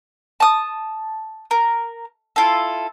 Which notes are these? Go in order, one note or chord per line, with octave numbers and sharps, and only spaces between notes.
A5 D#6
A#4
E4 F4 A4